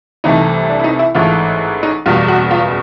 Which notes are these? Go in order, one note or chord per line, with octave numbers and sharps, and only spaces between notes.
C2 C3 E3 A3 D#4
D4
E4
D#4
E4
A1 G#2 E3 A3 F4
D#4
F#1 E2 B2 G3 F4
F#4
F4